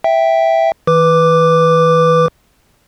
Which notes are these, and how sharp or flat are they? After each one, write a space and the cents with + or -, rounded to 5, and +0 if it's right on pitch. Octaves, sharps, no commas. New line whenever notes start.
E5 +0 G5 +0
E3 -40 B4 +0 D6 +0